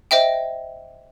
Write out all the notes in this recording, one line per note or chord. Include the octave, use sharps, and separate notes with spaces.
C5 D#5 E5 G5